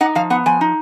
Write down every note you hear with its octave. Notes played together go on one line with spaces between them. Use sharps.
D#4 F#5
F3 F5
B3 F#5
F3 G#5
D#4